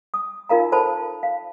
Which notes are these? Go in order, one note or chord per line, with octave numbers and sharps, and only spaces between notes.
D#6
D#4 F4 A#4 F5 A#5
A4 A#4 C5 A5 B5
F5